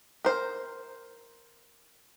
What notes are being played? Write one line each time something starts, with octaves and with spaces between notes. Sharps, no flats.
A#4 C5